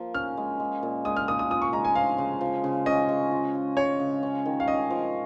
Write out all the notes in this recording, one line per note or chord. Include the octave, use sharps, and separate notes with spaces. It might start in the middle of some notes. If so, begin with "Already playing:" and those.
Already playing: F3 A#3
C#4 F6
G#3
G#3
A#2
G#3 D#6
F6
A#2 D#6
D#6
F4 D#6
C#6
G#3 A#5
G#5
F3 F5
C#3
F3
C#3
C#4 D#5
G#3
F4
G#3
G#3 C#5
C#3
C#4
D#3
F5
C#4 D#5
F3